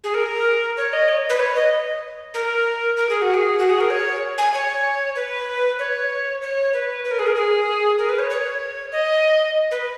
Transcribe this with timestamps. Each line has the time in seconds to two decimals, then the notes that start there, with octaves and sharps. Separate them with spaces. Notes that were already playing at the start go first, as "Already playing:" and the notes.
0.04 G#4
0.14 A#4
0.77 C#5
0.93 D#5
1.08 C#5
1.29 B4
1.39 C#5
1.55 D#5
2.34 A#4
2.97 A#4
3.09 G#4
3.22 F#4
3.34 G#4
3.59 F#4
3.70 G#4
3.80 A#4
3.90 C#5
4.38 G#5
4.54 C#5
5.15 B4
5.79 C#5
6.42 C#5
6.73 B4
7.04 B4
7.11 A#4
7.19 G#4
7.26 A#4
7.36 G#4
7.98 A#4
8.09 B4
8.19 C#5
8.30 C#5
8.92 D#5
9.71 B4